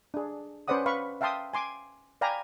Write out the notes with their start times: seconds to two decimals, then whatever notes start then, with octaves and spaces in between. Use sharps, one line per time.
0.14 D4 G#4
0.68 C#4 B4 C5 D5 F#5 D#6
0.86 B4 F5 B5 C#6
1.21 E5 F5 G5 A5 C6 D#6
1.53 G#5 C6 D6
2.21 D5 F5 G5 G#5 A#5 B5